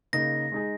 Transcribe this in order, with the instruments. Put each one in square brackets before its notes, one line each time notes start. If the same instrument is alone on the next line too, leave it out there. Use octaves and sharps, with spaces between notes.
[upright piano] C#3 A#3 D#4 [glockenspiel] A#6
[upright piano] G#3 D#4 G#4